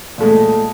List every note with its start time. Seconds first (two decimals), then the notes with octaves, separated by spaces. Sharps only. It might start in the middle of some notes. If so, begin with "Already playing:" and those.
0.18 A#2
0.20 A3
0.23 G#3